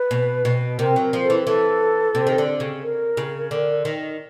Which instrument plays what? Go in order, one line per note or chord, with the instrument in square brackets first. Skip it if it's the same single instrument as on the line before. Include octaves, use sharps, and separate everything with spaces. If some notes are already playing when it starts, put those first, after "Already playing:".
Already playing: [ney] B4
[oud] B2
B2
[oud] C3 [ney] A#4
[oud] F#3
[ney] A#4
[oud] F3
[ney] A4
[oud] E3
[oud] E3 [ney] A4
[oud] C3
D#3
D3
C#3
[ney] A#4
[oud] C#3
D3
D#3